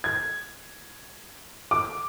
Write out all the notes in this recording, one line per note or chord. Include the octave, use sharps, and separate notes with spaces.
G#6
D6